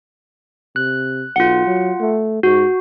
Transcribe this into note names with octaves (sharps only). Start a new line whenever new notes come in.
C3 F#6
B1 F4 F#5
F#3
A3
G#2 F#4